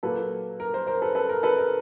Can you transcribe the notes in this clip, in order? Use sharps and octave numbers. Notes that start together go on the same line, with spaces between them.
A#2 F#3 A#3 A4 B4
A#4
A#4 C5
A#4 C5
A4 B4
A4 B4
A#4
A4 B4
A#4